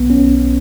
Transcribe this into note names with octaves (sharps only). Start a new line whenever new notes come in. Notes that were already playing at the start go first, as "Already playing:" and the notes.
Already playing: B1 B3
C#4